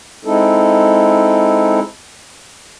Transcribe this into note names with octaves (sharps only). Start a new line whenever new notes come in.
G#3 C4 D#4 E4 A4